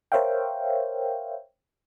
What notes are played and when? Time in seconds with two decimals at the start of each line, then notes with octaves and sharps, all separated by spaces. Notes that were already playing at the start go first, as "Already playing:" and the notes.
0.12 A#4 C5 C#5 E5 F5 G5